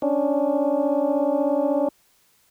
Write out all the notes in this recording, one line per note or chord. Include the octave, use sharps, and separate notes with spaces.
C#4 D4